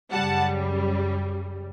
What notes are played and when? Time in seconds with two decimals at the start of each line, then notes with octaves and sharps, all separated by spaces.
0.11 F#2 C#3 G3 F#5 A5